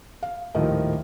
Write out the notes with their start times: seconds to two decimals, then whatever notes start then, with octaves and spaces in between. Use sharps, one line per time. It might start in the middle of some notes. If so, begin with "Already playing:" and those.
0.23 F5
0.55 D#1 A2 D#3 F3 A#4 D#5